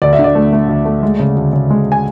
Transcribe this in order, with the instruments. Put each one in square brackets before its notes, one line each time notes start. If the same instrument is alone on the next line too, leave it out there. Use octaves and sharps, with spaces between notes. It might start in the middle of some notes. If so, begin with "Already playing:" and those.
[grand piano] D2 D5
E5
D3
D5
A3
A3
D2
A3
G#3
C#3
D2
C#3
G#3
G#5